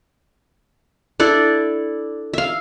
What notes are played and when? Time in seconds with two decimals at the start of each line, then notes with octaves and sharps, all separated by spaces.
1.20 D4 E4 A4 D5
2.34 E5 F5